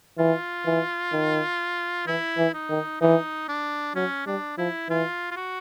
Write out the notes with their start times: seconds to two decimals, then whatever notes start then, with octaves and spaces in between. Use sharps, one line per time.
0.18 E3 F4
0.65 E3
1.12 D#3
2.07 E3 E4
2.37 E3
2.54 D#4
2.70 D#3
3.01 E3 D#4
3.48 D4
3.95 F#3 C#4
4.27 G3 D4
4.58 F3 E4
4.89 E3 F4
5.31 F4
5.37 F#4